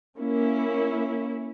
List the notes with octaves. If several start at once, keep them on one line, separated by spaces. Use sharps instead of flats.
A#3 C#4 E4